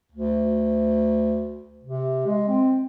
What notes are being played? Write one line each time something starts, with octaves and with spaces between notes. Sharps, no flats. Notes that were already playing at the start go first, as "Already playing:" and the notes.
D2
C3
G#3
C4